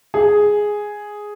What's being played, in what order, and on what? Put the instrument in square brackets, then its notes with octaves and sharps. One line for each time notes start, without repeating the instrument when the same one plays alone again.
[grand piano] G#4